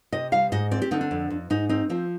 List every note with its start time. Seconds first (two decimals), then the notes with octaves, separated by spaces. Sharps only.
0.12 C3 D#5
0.32 G3 F5
0.52 G#2 D#5
0.71 C4 D5
0.82 G4
0.91 D3 D#4
1.01 D4
1.11 F2
1.30 F2
1.50 G#2 D#4
1.69 C4 D#4
1.89 F3 C4